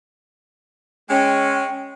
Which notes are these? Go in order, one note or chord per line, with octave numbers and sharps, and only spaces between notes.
G#3 C#4 G5